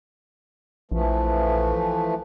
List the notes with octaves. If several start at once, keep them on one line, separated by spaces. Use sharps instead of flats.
A#1 E3 F3 A3